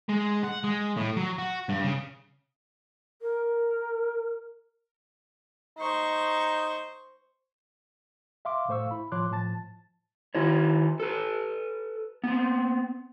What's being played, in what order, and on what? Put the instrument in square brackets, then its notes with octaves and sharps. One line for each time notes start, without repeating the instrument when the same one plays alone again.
[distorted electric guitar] G#3
F#5
G#3
A2
F#3
F#4
G2
C#3
[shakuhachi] A#4
[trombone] D#4 [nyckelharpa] C5 C#6
[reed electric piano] E5 F5 C6 D6
A2 A3 C5 F5 C#6 E6
E4 B5
A2 F3 C#5 C6 D6 F#6
A2 F3 A5 A6
[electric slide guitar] D#3 E4 C#5
A4 B4
B3 C4